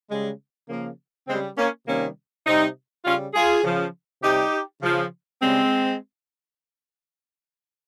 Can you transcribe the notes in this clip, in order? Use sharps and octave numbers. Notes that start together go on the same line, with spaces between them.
C#3 G3 G#3
C#3 F3 A#3
C#3 G#3 C4
G3
A#3 C#4
C3 D#3 G3 A#3 C#4
C3 G3 C4 D#4
C#3 G3 C#4 F4
F4 G#4
C#3 F3
C3 G3 D#4 G4
C#3 F3
C#3 G3 G#3 C4